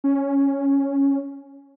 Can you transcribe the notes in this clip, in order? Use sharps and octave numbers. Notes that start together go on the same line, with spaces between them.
C#4